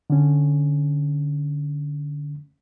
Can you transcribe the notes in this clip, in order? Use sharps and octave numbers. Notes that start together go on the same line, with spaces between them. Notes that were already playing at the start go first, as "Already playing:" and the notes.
D3 C#4